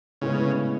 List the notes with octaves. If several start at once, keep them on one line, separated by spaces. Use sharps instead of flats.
A2 C#3 G#3 B3